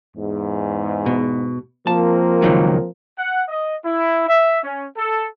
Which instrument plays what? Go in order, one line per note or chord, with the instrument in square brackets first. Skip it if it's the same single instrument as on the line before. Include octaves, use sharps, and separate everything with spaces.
[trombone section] E2 G#2
[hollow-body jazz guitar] B2
[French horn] F3 [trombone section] A#3 C4 A#4 [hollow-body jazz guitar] A5
[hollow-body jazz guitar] C#2 D#3 F#3
[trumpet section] F#5
D#5
E4
E5
C#4
A4